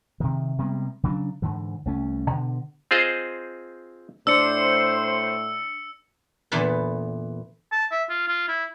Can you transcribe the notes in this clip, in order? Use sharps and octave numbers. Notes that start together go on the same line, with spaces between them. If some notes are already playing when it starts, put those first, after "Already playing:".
C3 D#3
C3 G3 G#3 B3
C#3 F#3 C#4 D4
G#2 D3 E3
C2 A3 C#4
B2 D3
C4 F4 G#4 C5 D#5
A2 D4 C5 E6 C#7
E2 A#2 D3 E3 B3 A5
A5
E5
F4
F4
E4